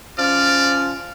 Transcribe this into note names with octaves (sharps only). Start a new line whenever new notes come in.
F3 C#4 D5 F6